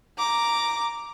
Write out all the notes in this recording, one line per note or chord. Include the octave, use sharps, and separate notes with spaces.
A#5 D6